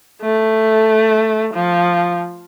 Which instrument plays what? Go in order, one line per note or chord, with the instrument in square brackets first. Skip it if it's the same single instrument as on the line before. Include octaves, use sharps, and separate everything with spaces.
[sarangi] A3
F3